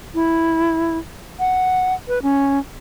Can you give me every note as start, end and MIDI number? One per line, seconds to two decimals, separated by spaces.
0.15 0.98 64
1.40 1.94 78
2.08 2.22 71
2.22 2.59 61